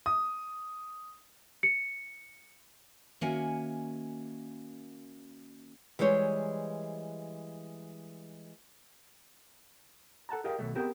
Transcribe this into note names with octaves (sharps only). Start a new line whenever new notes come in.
D#6
C#7
D#3 A#3 C#4 F#4 E5 G#5
E3 G3 G#3 C5 C#5
A4 F#5 A5 A#5
G4 G#4 A#4 D#5 F5 G5
B1 F2 B2 D#3 F#3 A3
B3 C4 G4 G#4 A#4 C5